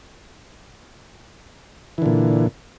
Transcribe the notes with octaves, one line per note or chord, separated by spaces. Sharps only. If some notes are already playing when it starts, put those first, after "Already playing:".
A#2 D3 E3